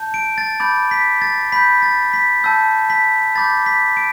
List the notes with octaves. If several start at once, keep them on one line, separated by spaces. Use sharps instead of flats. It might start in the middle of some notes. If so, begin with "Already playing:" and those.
Already playing: A5 G6
D7
A6
B5 D6 G6 A6
B6
A6
B5 G6 B6
A6
B6
A5 E6 G6
B6
B5 D6 G6 A6
B6
D7